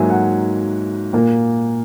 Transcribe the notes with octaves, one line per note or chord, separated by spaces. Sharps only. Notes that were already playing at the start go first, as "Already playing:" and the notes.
Already playing: G#2 F#3 A#3 E5 G#5
F#5
A#2 A#3